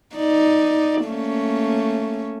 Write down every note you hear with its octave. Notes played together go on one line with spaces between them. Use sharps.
D#4 D5
A3 A#3 C#4